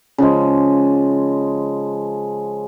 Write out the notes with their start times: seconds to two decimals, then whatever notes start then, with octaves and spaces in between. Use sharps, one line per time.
0.18 C#3 F3 G#3